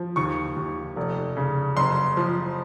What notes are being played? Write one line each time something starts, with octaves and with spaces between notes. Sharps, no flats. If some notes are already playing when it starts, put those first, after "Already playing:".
Already playing: F3
D#2 C#6
D#2
F1
C#3
F#1 C6
F3